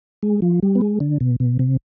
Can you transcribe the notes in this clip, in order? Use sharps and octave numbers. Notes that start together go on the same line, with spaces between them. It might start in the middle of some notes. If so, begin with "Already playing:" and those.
G#3
F3
G3
B3
G#3
D3
B2
B2
C3